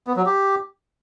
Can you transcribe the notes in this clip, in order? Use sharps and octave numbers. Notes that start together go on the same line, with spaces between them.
B3
F#3
G4